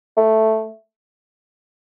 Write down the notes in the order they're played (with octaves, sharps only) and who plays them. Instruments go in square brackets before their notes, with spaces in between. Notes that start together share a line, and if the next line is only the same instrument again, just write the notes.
[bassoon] A3